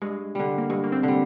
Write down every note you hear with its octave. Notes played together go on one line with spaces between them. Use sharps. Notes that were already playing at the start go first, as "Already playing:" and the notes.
G2 G#3
D3 G3
A#3
G2 G#3
A#3
C4
D3 G3